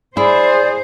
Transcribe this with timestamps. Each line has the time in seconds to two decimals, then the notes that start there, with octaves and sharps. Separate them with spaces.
0.17 E4 G#4 C5 D5